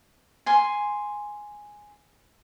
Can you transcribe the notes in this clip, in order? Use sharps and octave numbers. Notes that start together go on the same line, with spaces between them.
G#5 C6